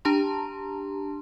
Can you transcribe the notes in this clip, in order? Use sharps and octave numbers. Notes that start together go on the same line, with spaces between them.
D4 G4 A5 A#5 C6